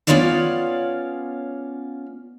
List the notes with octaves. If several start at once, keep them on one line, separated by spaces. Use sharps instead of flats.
B3 C#4 F4 C#5 D5 F5